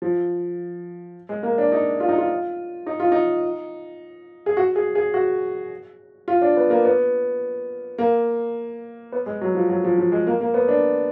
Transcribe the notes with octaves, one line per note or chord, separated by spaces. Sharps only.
F3
G#3
A#3
D4
D#4
F4
D#4
F4
D#4
F4
D#4
G#4
F#4
G#4
G#4
F#4
F4
D4
B3
A#3
B3
A#3
B3
G#3
F#3
F3
F#3
F3
F3
G#3
A#3
A#3
B3
D4